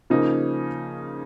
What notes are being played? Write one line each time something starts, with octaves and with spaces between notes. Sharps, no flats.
C#3 F3 A#3 D#4